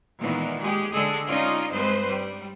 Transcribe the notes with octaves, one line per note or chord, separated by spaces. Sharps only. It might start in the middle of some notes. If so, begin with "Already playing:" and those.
A#2 D#3 E3 G#3 B3
G#3 G4 G#4
D3 G#3 G#4 A4
C#4 D#4 F4 D5 D#5
G2 G#3 C4 B4 C5
G3